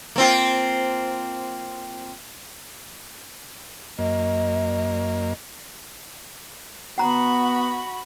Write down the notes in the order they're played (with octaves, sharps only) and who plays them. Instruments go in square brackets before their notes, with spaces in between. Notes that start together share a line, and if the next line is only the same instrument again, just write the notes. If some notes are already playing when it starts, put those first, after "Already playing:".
[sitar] A#3 C4 F4
[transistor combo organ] F#2 A#3 [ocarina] D#5
[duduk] B3 [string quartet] F#4 B5 [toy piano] F#5 A#5